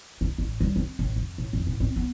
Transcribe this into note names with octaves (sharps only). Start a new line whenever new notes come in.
A3
A1
G3
C4
A1
F2
A2
F2
A2
C4
B3